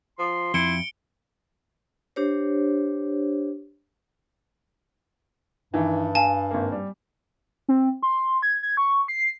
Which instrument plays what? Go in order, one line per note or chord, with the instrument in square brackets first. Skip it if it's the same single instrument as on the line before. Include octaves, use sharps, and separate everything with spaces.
[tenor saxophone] F3 [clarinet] C6
[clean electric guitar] F2 [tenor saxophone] E4 [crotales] C#7 D7 G7
[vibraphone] D4 G4 C5 C#5
[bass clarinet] G2 [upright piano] D#3 E3 D#4
[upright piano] F5 [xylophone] G#5 A5
[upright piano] G#1 A#3
G3
[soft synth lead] C4
C6
G#6
G#6
C#6
C7